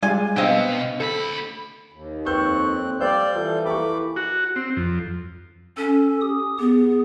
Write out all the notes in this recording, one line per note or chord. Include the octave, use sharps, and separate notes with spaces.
G3 G#3 F4 G#5
B2 C4 D4 D#5 F5 G5
D2 A4 B5
D#2
F2 C4 B4 C#6 E6 F#6 G6
G3 C5 D5 F5 G5 E6 G6
E3 F4 A4 C5
A#3 G4 A4 B5 C#6 D6
F#4
C4
F2
C#4 A4
G4 D#6
B3 G#4